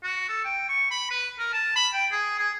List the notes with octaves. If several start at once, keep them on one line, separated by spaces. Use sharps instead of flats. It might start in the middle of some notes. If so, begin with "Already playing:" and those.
F#4
A4
G5
C#6
B5
B4
A#4
A5
B5
G5
G#4
G#4